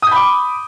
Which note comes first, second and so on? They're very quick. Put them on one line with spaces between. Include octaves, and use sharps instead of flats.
D#6 G6 B5 D6